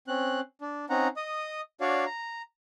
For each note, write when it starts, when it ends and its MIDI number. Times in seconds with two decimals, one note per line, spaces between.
0.08 0.40 60
0.08 0.40 61
0.08 0.40 90
0.61 0.85 62
0.90 1.08 60
0.90 1.08 61
0.90 1.08 63
0.90 1.08 78
0.90 1.08 82
1.17 1.61 75
1.17 1.61 87
1.81 2.05 62
1.81 2.05 66
1.81 2.05 73
1.81 2.05 74
1.81 2.05 77
2.06 2.42 82